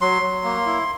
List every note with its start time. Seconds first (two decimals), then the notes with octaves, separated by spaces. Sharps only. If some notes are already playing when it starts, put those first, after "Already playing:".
0.01 F#3 C6
0.22 F#3
0.44 A#3
0.66 E4